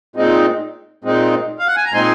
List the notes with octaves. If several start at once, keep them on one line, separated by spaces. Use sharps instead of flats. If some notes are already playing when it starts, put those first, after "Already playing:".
A#2 G#3 C4 D#4
A#2 G#3 C4 D#4
F5
F#5
G#5
A#5
A#2 G#3 C4 D#4 G#5 C6